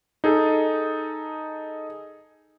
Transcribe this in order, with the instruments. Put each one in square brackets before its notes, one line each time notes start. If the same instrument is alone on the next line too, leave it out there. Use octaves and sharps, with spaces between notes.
[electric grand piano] D#4 G#4 A4